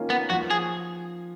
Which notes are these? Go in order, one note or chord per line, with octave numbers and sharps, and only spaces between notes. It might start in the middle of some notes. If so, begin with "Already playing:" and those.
Already playing: D#3 A#3 C#4 F4
B3
F3 F#4
G#4